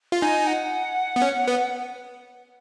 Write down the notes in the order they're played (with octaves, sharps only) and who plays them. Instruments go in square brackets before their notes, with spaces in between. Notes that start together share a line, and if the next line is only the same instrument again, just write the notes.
[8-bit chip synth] F4
[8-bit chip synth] D#4 [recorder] G#5
[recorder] F#5
[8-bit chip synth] B3
C#4
B3